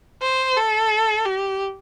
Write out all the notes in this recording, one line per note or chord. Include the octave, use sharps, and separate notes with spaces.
C5
A4
G4